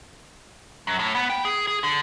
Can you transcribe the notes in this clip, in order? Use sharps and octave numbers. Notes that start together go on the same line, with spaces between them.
F#2
A2
B3
G5
G#4
G#4
D3